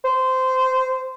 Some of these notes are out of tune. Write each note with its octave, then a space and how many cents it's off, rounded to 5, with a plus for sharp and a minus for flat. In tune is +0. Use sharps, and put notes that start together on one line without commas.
C5 -15